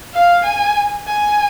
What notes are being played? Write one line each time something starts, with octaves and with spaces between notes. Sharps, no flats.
F5
G#5
G#5